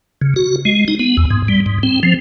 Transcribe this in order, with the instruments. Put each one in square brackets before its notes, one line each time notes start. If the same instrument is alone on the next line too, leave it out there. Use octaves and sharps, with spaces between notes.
[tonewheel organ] C#3
F#4
G#3
D#4
B3
E2
G#2
G3
G#2
C4
F3